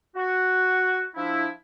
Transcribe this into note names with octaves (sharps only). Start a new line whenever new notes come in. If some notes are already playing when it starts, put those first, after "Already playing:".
F#4
F3 D4 E4